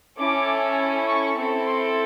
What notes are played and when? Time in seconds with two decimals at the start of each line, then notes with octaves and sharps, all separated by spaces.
0.18 C#4 E4 A4 D6
1.07 C#6
1.36 C4 E4 A4
1.66 C6